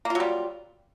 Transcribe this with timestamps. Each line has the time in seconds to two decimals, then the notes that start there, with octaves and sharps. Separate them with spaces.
0.05 A#3
0.10 F4
0.15 F#3
0.20 G3